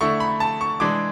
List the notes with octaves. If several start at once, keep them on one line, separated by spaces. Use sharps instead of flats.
D3 A3 E4 C#6
B5
A5
C#6
E3 G#3 D4 D6